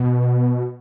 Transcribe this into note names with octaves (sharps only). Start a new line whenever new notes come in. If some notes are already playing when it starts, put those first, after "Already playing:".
Already playing: B2